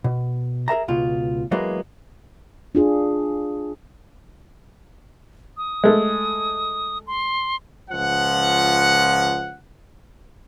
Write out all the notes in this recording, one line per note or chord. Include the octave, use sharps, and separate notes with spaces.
B2
G#4 A#4 E5 A#5
C#2 B2 F4
E3 F#3 G#3 A#3 B3
D4 F4 G#4
D#6
G#3 A3
C6
C#2 F3 F#5